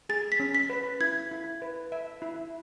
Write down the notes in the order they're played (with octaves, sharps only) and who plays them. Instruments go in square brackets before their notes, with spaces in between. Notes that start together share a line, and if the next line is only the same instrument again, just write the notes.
[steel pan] G#4 [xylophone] A6
[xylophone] B6
[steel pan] C#4
[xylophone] B6
[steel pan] B4
[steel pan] E4 [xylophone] G#6
[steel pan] E4
B4
E5
E4